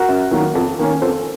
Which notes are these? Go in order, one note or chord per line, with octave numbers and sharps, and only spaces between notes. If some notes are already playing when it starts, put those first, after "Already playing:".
Already playing: F#4 A#4
F#2
D#3 F#3 A#3
F2
D#3 A#3 C#4
F2 A4 C5